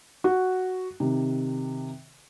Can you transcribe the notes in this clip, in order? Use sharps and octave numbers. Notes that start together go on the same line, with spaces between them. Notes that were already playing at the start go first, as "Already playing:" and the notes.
F#4
C3 D#3